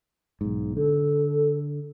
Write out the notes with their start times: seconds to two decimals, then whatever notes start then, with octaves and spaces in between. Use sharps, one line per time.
0.41 B1 G#2
0.77 D3 A4